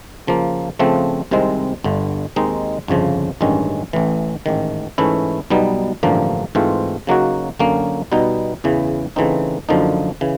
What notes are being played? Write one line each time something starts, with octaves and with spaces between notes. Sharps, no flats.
C#3 F3 A#3
C#3 F3 A3 C4
C2 C3 D#3 G#3 C4
G1 G2 D3
D#2 D#3 G#3 C4 D#4
G1 F2 C#3 F3
A1 G2 D#3 G#3 C#4
A1 A2 E3
A1 G#2 D#3
G#2 E3 A3 C#4 E4
B1 B2 G3 B3 D#4
A1 G2 D3 F3 A#3
G#2 E3 A3 C4 F4
C#3 F#3 A#3 D#4 F#4
F#2 D3 F#3 A#3 C#4
B2 G3 B3 D#4
E2 C#3 E3
C#3 E3 A3 C4 D#4
F#2 D3 F3 A#3 D#4
C#3 E3